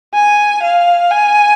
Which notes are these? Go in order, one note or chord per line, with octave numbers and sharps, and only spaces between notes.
G#5
F5
G#5